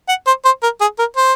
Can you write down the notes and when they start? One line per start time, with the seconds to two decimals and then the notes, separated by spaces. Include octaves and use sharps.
0.08 F#5
0.27 C5
0.45 C5
0.63 A#4
0.81 G#4
0.99 A#4
1.17 C5